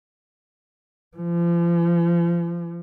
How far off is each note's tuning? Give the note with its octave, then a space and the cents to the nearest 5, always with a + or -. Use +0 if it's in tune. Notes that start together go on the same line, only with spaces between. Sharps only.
F3 -35